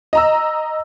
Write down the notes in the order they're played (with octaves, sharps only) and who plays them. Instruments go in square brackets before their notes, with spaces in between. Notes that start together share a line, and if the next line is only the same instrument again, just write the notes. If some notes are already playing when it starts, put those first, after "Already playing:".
[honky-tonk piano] D#5 A#5 E6